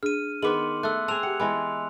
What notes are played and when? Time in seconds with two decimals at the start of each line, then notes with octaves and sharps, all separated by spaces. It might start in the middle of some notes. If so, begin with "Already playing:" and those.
0.03 D4 G#4 F6 D#7
0.43 D#3 B3 G#4 B4 C6 D6 F#7
0.83 A3 E6 F#6
1.08 C4 G#4 A5 E6 F7
1.23 G4 F#5 G5
1.40 E3 G#3 B3 G#5 B5 C6